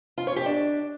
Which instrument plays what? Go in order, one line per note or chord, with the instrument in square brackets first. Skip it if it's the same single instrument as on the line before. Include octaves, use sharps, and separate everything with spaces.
[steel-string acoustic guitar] F4
C#5
G4
D4